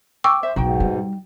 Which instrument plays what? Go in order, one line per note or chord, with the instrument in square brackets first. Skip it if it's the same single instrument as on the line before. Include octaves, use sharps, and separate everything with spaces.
[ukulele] G5 [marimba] C#6 D6 E6
[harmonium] C5 [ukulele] E5
[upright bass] B1 [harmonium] G#2 B2 [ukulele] D#4 F#4 G5
[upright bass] G3